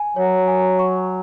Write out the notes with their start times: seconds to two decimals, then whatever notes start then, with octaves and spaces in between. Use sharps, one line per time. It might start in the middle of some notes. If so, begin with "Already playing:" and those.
Already playing: G#5
0.16 F#3 C#5
0.48 G#5
0.79 C#6